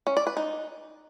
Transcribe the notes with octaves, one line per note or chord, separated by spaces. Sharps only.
C#4
D5
B4
D#4